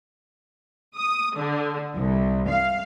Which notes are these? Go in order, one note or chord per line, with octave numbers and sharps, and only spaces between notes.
D#6
D3
C2
F5